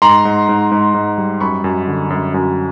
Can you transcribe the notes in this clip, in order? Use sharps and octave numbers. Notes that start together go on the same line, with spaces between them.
G#2 A#5 C6
G#2
G#2
G#2
G#2
G3
F#2 B5 C#6
F#2
D3
F#2
F#2